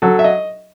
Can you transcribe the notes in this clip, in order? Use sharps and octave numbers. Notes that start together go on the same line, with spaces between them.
F#3 A4
E5
D#5